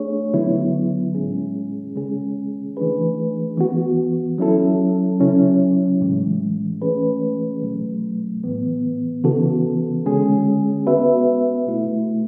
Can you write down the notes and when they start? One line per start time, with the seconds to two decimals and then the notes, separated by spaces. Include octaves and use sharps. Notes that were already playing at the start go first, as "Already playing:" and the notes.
Already playing: A3 D4 G#4 C#5
0.34 D3 F#3 B3 E4
1.15 A2 G#3 C#4 G#4
1.96 C#3 G#3 C#4 G#4
2.77 E3 A3 D4 G#4 B4
3.58 E3 B3 F#4
4.38 F#3 C#4 E4 A4
5.20 C#3 F#3 C#4 E4
6.01 A2 E3 G#3
6.81 E3 A3 C#4 G#4 B4
7.62 B2 F#3 A3
8.44 A2 E3 B3
9.24 C#3 E3 B3 F#4 A4
10.06 D3 G#3 C#4 G#4
10.86 B3 F#4 B4 E5
11.67 B2 A3 E4